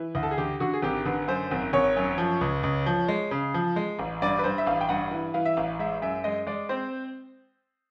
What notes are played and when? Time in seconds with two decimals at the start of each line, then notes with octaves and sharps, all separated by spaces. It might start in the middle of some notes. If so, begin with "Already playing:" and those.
Already playing: E3
0.15 D2
0.23 A4
0.31 G#4
0.38 D3 G4
0.60 D3 F#4
0.73 G#4
0.82 G#1 G4
1.05 D3 B4
1.28 F#2 C5
1.51 G#1
1.73 G#1 C#5
1.96 F#2
2.18 F3
2.41 C#2
2.63 C#2
2.86 F3
3.08 G#3
3.31 C#3
3.54 F3
3.76 G#3
3.99 A1
4.22 G2 D5
4.39 B4
4.44 G2 C5
4.58 E5
4.66 A1 F5
4.81 G5
4.89 G2 F#5
5.11 E3
5.34 E3 F5
5.45 E5
5.57 A1 F5
5.79 G#3 E5
6.02 F#2 E5
6.24 G#3 D#5
6.47 G#3 D5
6.69 C4 C5